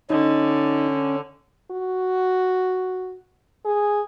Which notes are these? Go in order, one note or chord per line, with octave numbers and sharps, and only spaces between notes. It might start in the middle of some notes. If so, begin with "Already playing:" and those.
D3 C#4 D#4 D#5
F#4
G#4